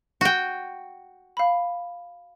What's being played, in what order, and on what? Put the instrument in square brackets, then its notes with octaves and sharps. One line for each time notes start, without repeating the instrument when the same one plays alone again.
[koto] F#4 G5
[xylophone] F5 B5